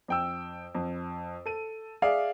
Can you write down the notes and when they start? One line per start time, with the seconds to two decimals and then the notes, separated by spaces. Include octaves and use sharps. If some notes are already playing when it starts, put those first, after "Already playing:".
0.08 F2 G5 E6
0.75 F2
1.46 A4 D#7
2.02 G#4 D5 E5 F5